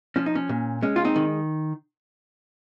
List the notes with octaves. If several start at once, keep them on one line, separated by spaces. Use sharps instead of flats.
F3 C#4
D#4
C#4
A#2
G#3 C#4
F4
C4 D#4
D#3